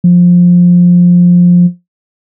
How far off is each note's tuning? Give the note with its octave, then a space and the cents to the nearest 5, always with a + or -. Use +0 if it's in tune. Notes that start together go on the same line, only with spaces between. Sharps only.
F3 +15